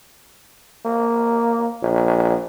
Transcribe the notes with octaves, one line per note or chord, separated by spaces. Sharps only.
A#3
A#1